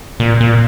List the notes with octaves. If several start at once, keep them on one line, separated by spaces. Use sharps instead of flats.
A#2
A#2